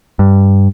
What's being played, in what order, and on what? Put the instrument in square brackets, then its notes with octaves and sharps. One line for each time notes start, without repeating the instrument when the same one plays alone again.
[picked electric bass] G2